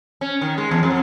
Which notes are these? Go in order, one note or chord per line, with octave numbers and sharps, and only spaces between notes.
C#4
D#3
G#3
E2
F2